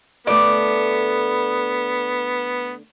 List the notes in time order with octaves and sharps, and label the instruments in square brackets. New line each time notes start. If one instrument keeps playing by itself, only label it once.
[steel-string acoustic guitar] D3 A3 [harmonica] B3 [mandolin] D5